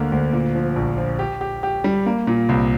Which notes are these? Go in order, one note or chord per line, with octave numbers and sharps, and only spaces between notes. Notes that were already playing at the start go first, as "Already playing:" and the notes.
Already playing: D2 D3 A#3
D2
A#2
F3
A#1
F3
G4
G4
G4
G3
A#3
A#2
C2